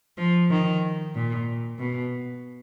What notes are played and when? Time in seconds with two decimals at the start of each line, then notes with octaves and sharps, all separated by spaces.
0.18 F3
0.51 D#3
1.15 A#2
1.79 B2